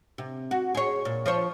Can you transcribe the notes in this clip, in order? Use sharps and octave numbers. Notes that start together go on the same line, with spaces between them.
C3
F#4
G#4 C#5
A#2
F3 C5 C#5